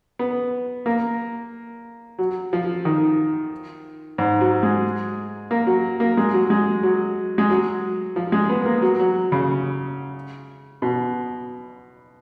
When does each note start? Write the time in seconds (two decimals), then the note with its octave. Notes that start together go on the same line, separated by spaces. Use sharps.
0.19 B3
0.86 A#3
2.18 F#3
2.53 F3
2.85 D#3
4.18 G#2
4.41 F#3
4.63 G#3
5.51 A#3
5.67 F#3
6.00 A#3
6.17 G#3
6.34 F#3
6.50 G#3
6.83 F#3
7.38 G#3
7.50 F#3
8.16 F3
8.32 G#3
8.50 B3
8.65 A#3
8.82 F#3
9.00 F#3
9.32 C#3
10.82 B2